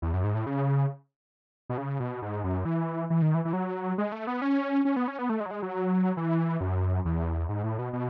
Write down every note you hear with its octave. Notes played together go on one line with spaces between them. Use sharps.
E2
F#2
G#2
A2
C#3
B2
C#3
B2
G#2
F#2
E3
E3
D#3
E3
E3
F#3
G#3
A3
B3
C#4
C#4
B3
C#4
B3
A3
G#3
F#3
G#3
F#3
E3
F#2
E2
G#2
A2
B2
B2